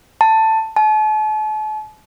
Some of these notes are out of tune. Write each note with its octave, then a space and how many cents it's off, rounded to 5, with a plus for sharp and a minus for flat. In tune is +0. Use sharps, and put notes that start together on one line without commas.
A5 +10
A5 -40